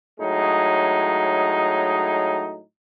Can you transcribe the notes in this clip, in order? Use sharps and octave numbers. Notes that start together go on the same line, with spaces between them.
A2 F#3 G#3 D#4